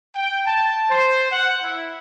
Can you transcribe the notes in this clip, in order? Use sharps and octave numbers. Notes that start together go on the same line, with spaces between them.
G5
A5
C5
F#5
E4